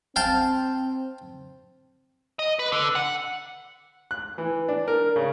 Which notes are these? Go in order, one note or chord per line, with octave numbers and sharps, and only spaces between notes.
C4 F5 G5 A5
D#5
B4
D3
F#5
F#6
E3
D4
A#4
C#3